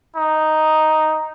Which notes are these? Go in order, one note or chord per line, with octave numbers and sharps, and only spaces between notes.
D#4